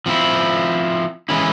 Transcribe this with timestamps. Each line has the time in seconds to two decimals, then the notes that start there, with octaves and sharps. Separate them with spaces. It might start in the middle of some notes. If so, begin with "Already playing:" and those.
0.06 F3 C4 E4
1.29 E3 G#3 C#4 E4